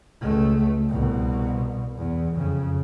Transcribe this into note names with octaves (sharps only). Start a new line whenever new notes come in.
C#2 A3
C2 B2
E2
F2 C#3